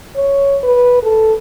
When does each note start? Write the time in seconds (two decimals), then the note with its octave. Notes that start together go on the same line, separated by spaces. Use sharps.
0.16 C#5
0.63 B4
1.03 A4